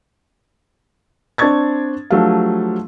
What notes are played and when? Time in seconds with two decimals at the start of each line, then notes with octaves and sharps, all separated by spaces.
1.38 C4 D4 D5 C#6 G#6 A6
2.10 F3 F#3 A3 D4 G4 F5